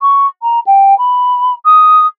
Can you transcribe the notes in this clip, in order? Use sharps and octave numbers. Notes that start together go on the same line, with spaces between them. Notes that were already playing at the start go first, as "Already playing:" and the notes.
C#6
A#5
G5
B5
D#6